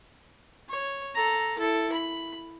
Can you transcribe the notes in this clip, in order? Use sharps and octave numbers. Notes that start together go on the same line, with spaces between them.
C#5
A4 A#5
E4 A4
B5